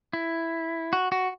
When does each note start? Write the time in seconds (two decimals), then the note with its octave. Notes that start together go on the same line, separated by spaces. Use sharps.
0.13 E4
0.93 F#4
1.12 F#4